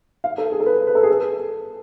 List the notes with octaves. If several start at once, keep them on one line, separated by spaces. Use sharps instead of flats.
F5
A4
G#4
A4
B4
B4
A4
G#4
A4